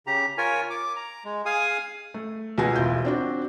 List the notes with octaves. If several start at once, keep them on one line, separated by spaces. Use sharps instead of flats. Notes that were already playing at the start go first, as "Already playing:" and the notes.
C#3 G4 A#5
F4 A#4 C#5 G#5
D6
A#5
G#3
G#4 F5 G#5 D#6
A3
C#2 B2 B3 G#4 G#5 A#6
E1 E4 F4 G6
C4 D4 F#4